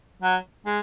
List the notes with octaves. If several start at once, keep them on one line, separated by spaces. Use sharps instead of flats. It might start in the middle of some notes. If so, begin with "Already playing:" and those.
F#3
G#3